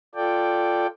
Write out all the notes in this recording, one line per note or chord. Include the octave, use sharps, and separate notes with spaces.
F4 A4 D5 G5